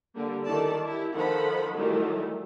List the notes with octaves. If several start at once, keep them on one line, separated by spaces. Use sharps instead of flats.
D3 G3 A#3
D#3 E3 A4 D5 A5
E4 G4
D#3 F3 A4 F#5 B5
D#3 E3 F#3 G3 A3